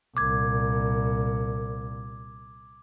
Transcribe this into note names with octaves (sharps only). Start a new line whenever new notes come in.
C2 A#2 D6 G#6